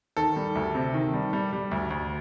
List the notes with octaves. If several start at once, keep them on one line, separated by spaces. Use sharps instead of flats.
D#3 A4
G3
D2
C3
D#3
G3
G3
G3
D2
D2